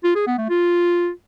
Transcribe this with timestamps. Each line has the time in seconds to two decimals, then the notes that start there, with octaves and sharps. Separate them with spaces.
0.04 F4
0.15 G#4
0.27 B3
0.38 A3
0.50 F4